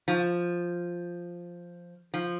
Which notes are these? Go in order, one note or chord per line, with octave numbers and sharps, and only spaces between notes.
F3
F3